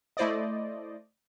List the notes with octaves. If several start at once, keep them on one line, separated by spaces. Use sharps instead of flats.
A3 E4 C5 D5 D#5